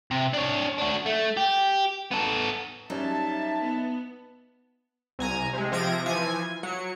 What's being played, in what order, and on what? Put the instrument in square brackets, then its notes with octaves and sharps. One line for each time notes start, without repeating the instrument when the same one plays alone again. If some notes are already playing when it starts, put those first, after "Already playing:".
[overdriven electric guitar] C3
D4 C#5
D4 F#4
A3
G4
B3 A4
[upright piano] F#2 F#3 G3 [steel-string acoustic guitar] D#4 [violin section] E5 A5
[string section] B3
[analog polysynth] C2 G#5 A#5 G#6
C3 G#3
C3 F3 G#6 A#6 D7
E3 F3 G#5 G#6
F#3 C#7